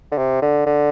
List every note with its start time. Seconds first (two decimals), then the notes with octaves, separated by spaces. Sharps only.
0.12 D3
0.18 C3
0.42 D3
0.66 D3